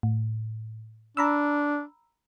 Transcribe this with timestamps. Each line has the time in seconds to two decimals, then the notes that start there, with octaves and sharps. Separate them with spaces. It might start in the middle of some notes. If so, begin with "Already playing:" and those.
0.03 A2
1.17 D4 A#5 B5 E6